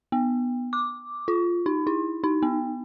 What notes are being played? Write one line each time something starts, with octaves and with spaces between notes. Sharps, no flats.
B3
D6
F4
D#4
E4
D#4
B3